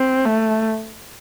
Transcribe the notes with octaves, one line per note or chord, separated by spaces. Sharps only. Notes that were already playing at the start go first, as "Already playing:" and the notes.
Already playing: C4
A3